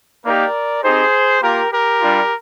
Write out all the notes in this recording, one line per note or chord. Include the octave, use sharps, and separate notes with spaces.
A#3 D#4 G4 A#4 D5
C4 D#4 G4 G#4 C5
A#3 F4 G4 A#4
G4 A#4
G3 D4 F4